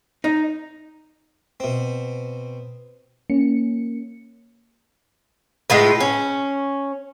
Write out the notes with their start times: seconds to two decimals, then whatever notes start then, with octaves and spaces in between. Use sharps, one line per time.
0.24 D#4
1.60 B2 C4
3.30 A#3 C#4 C#7
5.70 A2 G#3 F4 B4
6.01 C#4